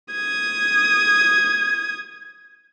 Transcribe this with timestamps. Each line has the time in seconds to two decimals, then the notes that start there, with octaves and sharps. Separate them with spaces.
0.14 D#6 G#6